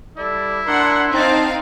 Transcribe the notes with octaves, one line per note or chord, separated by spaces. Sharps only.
G3 E4 A4 D5
D4 A#4 F#5 C6
C4 D#4 C5 F5 A5